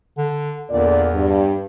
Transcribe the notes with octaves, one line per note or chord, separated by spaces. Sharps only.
D3
E2 A#2 D3 D5
G2